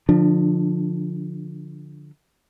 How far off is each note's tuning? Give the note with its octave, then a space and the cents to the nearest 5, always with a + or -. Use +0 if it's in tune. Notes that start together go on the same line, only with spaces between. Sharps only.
D3 +0 F3 +10 D4 +30